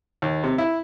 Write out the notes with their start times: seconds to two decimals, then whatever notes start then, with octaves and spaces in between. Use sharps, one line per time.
0.22 D#2
0.43 C3
0.58 E4